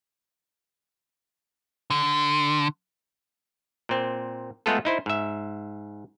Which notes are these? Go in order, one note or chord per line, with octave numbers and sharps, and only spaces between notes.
D3
A#2 C4
G#3 A3 B3 F4 G#4 A4
D#4 E4 C5
G#2 E5